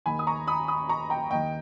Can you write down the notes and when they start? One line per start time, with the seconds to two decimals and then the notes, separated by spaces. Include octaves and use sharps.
0.06 D#2 D#3 G#5 B5
0.19 D#6
0.27 A#5 C#6
0.47 B5 D#6
0.68 B5 D#6
0.89 A#5 C#6
1.10 G5 A#5
1.31 D#2 D#3 D#5 G5